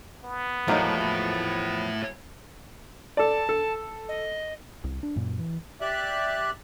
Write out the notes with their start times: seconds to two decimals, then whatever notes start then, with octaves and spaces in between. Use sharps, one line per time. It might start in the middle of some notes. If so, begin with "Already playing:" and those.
0.25 B3
0.68 E2 A2 F3 F#3 A3 A#3 D#4
3.17 A4 D5 A5
3.49 A4
4.08 D#5
4.84 C2
5.03 D4
5.16 F#2 A#2
5.39 E3
5.81 G4 D5 E5 F#6